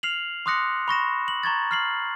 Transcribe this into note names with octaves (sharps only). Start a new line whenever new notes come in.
F6 C7 F7 F#7
C6 D6 D#6 F#6 A#6 C#7
B5 C#6 A#6 E7
F#7
A#5 C#6 G#6 A6
F6 C7 F#7